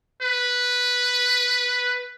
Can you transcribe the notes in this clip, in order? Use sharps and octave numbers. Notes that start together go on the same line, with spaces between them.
B4